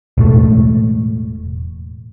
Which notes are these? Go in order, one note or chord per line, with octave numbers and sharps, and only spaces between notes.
E1 A2 A3